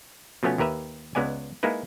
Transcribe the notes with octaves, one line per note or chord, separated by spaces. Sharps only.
B2 F3 A3 B3 C#4
D#2 G4 A#4 B4 E5
C#2 G#3 B3 D5 G#5
G#3 A#3 D#4 E4 B4